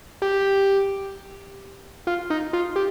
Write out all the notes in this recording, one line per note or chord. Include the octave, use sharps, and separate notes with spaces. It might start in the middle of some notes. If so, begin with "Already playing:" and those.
G4
F4
D#4
F4
G4